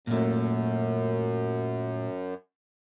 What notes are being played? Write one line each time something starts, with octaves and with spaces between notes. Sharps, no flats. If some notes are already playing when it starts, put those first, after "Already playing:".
F#2 A#2 A3